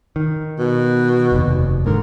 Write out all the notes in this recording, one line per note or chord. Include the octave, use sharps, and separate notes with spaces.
D#3
B2
F1 D#2
G#2 D3 A#4